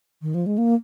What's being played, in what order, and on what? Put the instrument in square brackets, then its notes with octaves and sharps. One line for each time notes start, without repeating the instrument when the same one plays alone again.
[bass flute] D#3
F3
G#3
A#3